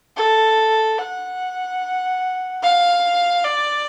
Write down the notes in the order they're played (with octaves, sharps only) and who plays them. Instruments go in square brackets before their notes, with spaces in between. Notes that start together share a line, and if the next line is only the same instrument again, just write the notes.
[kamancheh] A4
F#5
F5
D5